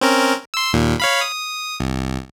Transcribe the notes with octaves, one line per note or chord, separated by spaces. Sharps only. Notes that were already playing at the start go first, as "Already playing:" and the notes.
C4 C#4 A#4
C6 E6
D#2 A#2
C#5 F5 B5
D#6
C2